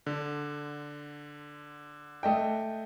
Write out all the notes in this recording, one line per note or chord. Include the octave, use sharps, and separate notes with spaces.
D3
A3 D#5 G5